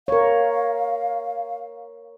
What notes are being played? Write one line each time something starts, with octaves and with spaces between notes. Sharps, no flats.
A#4 C#5 F5